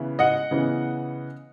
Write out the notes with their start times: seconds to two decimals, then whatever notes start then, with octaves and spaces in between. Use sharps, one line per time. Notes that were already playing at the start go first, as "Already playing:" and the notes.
Already playing: C#3 E3 B3 E4
0.19 D#5 F#5
0.51 C#3 E3 B3